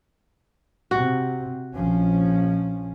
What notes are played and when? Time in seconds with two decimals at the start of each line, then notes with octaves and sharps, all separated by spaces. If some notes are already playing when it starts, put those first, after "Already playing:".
0.91 C3 F#4
1.74 A#1 F3 C#4